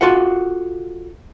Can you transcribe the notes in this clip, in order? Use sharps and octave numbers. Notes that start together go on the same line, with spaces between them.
F4 F#4 A4 F5 F#5